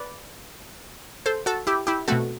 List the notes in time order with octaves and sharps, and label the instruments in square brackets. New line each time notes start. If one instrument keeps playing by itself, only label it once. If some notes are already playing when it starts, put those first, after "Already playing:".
Already playing: [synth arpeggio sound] B4 D5
A4 C5
F#4 A4
E4 G4
E4 G4
B2 A3 C4 F#4 A4